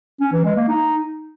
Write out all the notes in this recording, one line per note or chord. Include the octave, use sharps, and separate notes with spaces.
C#4
E3
G#3
A#3
D#4